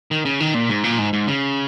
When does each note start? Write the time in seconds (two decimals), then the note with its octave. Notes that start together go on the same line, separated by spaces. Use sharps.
0.11 D#3
0.25 C#3
0.40 D#3
0.54 A#2
0.69 G#2
0.84 A#2
0.99 G#2
1.13 G#2
1.28 C#3